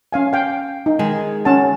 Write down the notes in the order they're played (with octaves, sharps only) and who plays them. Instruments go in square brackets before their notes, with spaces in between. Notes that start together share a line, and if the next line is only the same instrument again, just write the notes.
[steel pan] C#4 F5 G#5
F5 G5
D#4
[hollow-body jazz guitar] D#3 G#3 G#4
[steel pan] C#4 F#5 A5